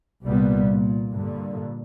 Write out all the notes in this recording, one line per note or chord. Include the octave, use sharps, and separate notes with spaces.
C2 A#2 G3 B3
A#2
G2 A#2 D3